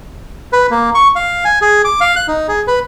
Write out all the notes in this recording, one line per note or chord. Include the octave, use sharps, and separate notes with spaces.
B4
A#3
C#6
F5
G#5
G#4
D6
F5
F#6
D#4
G#4
B4